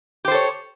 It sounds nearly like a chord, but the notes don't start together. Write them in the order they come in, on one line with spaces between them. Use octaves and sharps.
G4 C5 A4 C#5